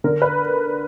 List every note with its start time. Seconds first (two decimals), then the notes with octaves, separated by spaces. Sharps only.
0.04 D3 A#4
0.22 B4